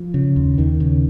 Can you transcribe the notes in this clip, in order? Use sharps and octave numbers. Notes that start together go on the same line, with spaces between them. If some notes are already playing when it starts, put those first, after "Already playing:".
Already playing: F3
C#3
D#2
D#2 D#3
C#3